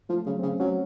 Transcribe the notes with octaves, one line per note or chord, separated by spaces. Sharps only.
F3 A3
C#3 F#3
C4
C#3 C#4
F#3 C#4